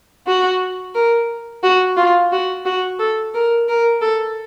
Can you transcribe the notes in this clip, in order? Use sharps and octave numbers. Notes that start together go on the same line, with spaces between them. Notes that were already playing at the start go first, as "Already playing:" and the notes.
F#4
A#4
F#4
F4
F#4
F#4
A4
A#4
A#4
A4